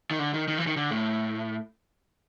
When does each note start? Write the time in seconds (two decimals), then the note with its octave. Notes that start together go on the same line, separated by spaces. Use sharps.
0.11 D#3
0.19 D3
0.33 D#3
0.48 D#3
0.58 E3
0.67 D#3
0.76 D3
0.91 A2